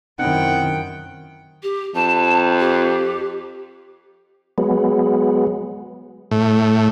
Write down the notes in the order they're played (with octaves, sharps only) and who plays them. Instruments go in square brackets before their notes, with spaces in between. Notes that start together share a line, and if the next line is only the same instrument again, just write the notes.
[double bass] F#2 D#3 [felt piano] C4 E4 [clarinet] F#5 [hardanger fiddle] G5
[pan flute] G4
[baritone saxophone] F2 [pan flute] A5
[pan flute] G4
[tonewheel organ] F#3 G#3 B3
[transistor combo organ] A2